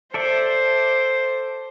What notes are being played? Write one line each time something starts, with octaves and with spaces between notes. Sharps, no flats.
A4 C5 D5 E5